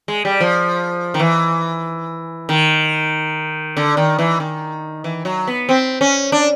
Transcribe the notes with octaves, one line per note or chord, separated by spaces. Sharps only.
G#3
G3
F3
D#3
E3
D#3
D3
D#3
E3
D#3
E3
F#3
B3
C4
C#4
D4